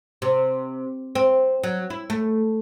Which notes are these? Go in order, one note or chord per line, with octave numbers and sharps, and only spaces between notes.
C3
C4
F#3
E4
A3